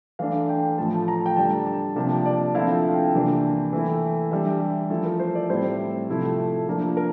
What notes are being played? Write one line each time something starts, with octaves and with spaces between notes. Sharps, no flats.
E3 A3 D4 F5
G5
A2 F3 A3 A5
A#5
G5
D3 G3 D4 A5
A5
C3 F3 A#3 D4 A5
D5
D3 F3 A3 C4 E4 F5
F5
G5
C3 E3 A#3 D4
E3 A3 E4
E3 G3 D4 E5
G4
F3 A3 E4 A4
A#4
C5
D5
A2 G3 C4 E4 C5
C3 F3 A3 E4
F3 A#3 D4
A#4